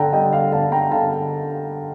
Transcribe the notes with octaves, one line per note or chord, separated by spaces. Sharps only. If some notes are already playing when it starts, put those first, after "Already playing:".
Already playing: D3 G5 A5 A#5
G3 D#5 G5
D5 F5
D3 F5 A5
G5 A#5
D3 F5 A5